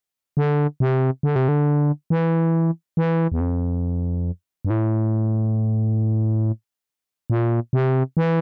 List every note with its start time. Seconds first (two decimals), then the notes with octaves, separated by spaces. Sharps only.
0.37 D3
0.80 C3
1.23 D3
1.36 C3
1.48 D3
2.10 E3
2.97 E3
3.32 E2
3.41 F2
4.65 G2
4.70 A2
7.30 A#2
7.73 C3
8.17 E3